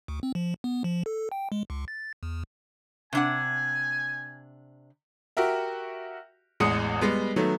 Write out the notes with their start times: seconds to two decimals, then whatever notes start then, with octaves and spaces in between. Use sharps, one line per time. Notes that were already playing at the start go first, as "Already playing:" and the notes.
0.08 D2
0.23 C4
0.35 F3
0.64 B3
0.84 F3
1.06 A4
1.32 G5
1.52 G#3
1.70 C#2
1.88 A6
2.23 E2
3.13 C3 D4 F#5 G#5
5.37 F#4 G4 A#4 E5
6.60 A1 E2 G#3 D#6 C#7
7.01 G3 G#3 B3
7.36 D#3 F#3 A3 B3